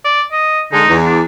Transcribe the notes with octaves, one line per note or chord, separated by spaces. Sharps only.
D5
D#5
D3 G#3 D#4
E2
D4